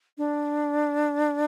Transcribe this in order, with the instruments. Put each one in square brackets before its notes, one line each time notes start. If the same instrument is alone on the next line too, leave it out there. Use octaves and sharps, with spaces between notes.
[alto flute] D4